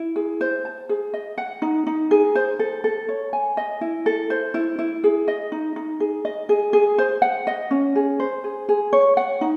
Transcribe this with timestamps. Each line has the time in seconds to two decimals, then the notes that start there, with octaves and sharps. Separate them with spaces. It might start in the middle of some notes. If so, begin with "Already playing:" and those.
Already playing: E4
0.16 G#4
0.41 C5
0.65 A5
0.89 G#4
1.14 D#5
1.38 F#5
1.62 D#4
1.87 D#4
2.11 G#4
2.35 C5
2.59 A4
2.84 A4
3.09 C#5
3.33 G#5
3.57 D#5
3.81 E4
4.06 A4
4.30 C5
4.54 E4
4.79 E4
5.04 G#4
5.28 D#5
5.52 D#4
5.76 D#4
6.00 G#4
6.25 D#5
6.49 G#4
6.73 G#4
6.98 C5
7.22 F#5
7.47 D#5
7.71 C#4
7.95 G#4
8.20 C5
8.44 G#4
8.69 G#4
8.93 C#5
9.17 F#5
9.41 D#4